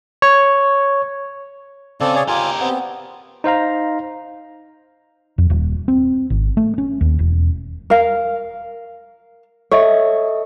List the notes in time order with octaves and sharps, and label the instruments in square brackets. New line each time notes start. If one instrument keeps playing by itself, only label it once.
[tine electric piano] C#5
[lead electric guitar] C#3 [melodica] C4 A4 D5
[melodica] G#4 C#5 D5
[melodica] F4 G#5 [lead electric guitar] G4 A#4
[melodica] B3 C4
[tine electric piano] D#4 C5 F5 A#5
[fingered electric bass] F2
D#1
C4
G#1
A3
C#4
D#2
E1
[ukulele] A#4 F5
[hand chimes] A4 D#5 E5 [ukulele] C#5